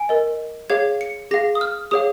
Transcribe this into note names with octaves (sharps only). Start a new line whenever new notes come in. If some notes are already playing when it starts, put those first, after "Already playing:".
Already playing: G#5
A#4 D#5
G#4 C#5 F5 G#6
C#7
G#4 F5 A#6
D#6
F6
G#4 C#5 F5 D#6